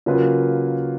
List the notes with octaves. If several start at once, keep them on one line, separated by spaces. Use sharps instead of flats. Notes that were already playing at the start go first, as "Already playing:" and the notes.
C#3 F#3 A#3 F4 B4